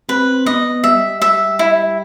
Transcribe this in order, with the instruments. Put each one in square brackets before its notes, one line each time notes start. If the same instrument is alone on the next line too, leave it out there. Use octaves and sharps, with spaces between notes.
[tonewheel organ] C4 [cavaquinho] B4
[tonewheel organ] B3 [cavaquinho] D#5
[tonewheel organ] G3 [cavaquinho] E5
[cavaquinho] E5
E4